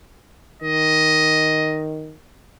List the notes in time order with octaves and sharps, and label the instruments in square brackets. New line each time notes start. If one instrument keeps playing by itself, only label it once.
[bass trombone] D#3 [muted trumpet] D#5